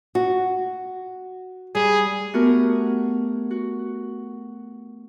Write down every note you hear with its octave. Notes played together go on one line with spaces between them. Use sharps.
F#4
G3 G#4
A3 B3 F#4 G4 A#4
F#4